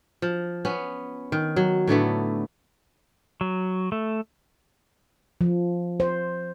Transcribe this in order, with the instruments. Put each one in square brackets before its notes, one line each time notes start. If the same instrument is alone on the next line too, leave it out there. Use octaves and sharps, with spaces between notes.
[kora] F3
B3 C#4
D#3
F#3
A2 D3 A3 B3
[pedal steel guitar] F#3
A3
[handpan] F3
C5